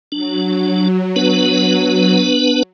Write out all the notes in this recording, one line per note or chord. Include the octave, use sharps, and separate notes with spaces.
F#3 D4
B3 D4 B4